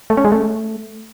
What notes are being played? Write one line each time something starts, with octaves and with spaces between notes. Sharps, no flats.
A3
C#4
G#3
A3